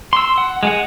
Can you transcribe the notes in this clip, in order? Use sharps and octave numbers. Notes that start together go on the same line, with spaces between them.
C6 E6
F#5
G#3 G#4 F#5